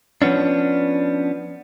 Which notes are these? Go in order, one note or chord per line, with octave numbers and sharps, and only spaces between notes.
F3 B3 C#4 D4